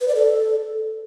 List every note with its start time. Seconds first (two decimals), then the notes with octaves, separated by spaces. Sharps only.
0.01 B4
0.08 D5
0.15 A4